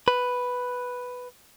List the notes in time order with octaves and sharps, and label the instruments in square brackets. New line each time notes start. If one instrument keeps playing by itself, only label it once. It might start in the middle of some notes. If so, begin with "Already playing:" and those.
[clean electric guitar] B4